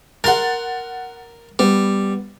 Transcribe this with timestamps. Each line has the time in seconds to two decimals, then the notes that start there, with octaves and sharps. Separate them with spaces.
0.24 A#4 F#5 C6 A6
1.59 G3 B3